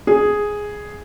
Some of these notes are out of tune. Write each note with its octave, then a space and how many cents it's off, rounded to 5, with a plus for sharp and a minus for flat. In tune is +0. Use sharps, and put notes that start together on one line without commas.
G#4 +0